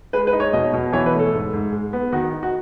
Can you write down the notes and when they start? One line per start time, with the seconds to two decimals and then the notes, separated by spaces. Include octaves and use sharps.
0.13 G#3 B4
0.27 B4
0.33 D#4
0.40 C#5
0.53 B2 D#5
0.73 B2
0.93 E3 C#5
1.06 B4
1.14 A3
1.19 A4
1.34 G#2
1.53 G#2
1.72 G#3
1.93 B3
2.12 D#3 F#4
2.33 D#4
2.43 F#4